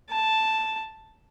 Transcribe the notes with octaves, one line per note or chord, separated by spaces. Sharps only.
A5